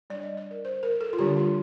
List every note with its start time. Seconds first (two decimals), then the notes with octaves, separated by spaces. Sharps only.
0.10 G3 D4 D5
0.23 D#5
0.37 D5
0.51 A#4
0.65 C5
0.83 A#4
1.01 A4
1.13 F4
1.19 D3 G3 D4 G4
1.37 F4